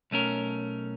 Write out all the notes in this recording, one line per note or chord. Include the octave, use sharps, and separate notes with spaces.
B1 A3 C#4 A#4